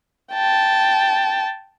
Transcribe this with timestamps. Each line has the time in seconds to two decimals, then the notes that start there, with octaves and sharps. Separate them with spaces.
0.33 G5 A5